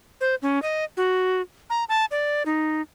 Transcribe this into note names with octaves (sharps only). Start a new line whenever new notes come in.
C5
C#4
D#5
F#4
A#5
A5
D5
D#4